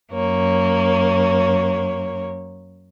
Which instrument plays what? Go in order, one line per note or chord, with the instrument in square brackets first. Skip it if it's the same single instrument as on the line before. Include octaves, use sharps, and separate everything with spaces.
[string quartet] F#2 A#3 C#5